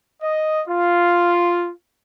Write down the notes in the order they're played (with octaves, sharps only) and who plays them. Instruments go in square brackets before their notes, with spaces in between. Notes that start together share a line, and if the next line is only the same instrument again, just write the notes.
[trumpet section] D#5
F4